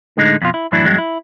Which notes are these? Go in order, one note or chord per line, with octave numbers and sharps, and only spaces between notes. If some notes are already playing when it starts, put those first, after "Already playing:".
A2 D3 G#3 D#4
F2 B2 F4
E4
F#2 A2 E3 F#3 D4 E4
E2 G2 F#3 G#3
E4